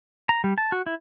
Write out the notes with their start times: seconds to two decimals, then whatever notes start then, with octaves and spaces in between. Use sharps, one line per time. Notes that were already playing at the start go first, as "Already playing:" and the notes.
0.29 A#5
0.44 G3
0.58 A5
0.72 F#4
0.86 E4